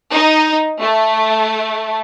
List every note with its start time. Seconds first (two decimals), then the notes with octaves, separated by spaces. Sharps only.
0.13 D#4
0.80 A3